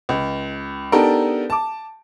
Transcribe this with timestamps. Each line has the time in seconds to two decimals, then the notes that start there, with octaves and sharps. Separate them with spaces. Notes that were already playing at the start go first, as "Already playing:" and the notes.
0.09 C#2
0.92 B3 D4 D#4 G4 A4 A#4
1.50 A5 D6